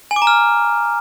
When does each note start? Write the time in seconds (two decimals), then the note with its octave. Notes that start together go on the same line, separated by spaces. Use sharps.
0.11 G#5
0.16 D6
0.22 A#5
0.27 F6